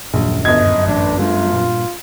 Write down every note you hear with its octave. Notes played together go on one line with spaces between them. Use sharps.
D#1 A#1 F#2
G1 D#5 G#6
A1 D4
G3 A3 D4 F4
G2 A#2